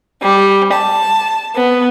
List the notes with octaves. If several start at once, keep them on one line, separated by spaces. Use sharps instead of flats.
G3
A5
B3